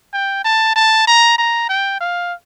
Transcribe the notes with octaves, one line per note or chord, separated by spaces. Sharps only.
G5
A5
A5
A#5
A#5
G5
F5